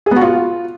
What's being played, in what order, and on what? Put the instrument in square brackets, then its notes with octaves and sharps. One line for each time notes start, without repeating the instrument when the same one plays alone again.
[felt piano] G#4
B3
F#4
F4